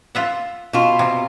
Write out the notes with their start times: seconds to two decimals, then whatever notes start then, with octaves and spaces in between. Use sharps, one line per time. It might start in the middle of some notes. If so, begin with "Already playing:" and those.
0.15 F4 E5 F#5
0.73 B2 F4
0.99 C3